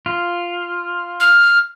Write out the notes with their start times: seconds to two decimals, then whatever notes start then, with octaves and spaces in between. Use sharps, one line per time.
0.06 F4
1.20 F6